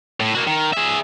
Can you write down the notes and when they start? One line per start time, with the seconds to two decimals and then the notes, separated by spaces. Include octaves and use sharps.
0.20 A2
0.35 A#3 F#4
0.47 D#3
0.73 G#4 E5